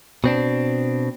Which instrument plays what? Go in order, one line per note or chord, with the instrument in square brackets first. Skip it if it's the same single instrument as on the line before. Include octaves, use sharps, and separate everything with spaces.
[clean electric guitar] B2 C4 D4